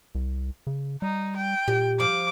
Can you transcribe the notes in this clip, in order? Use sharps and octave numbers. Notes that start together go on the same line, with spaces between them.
C2
C#3
G3 D#4
G5
A#2 G4
F3 D6